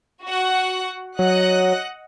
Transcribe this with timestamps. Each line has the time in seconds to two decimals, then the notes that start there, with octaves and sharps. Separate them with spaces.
0.23 F#4 F#5
1.19 F#3 D#5 F#5 F#6